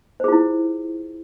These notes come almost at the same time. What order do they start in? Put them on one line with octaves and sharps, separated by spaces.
C5 G#4 F4 E4